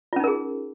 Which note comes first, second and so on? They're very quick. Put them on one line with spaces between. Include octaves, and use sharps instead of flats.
F4 C#4 D#4 A#4 G#4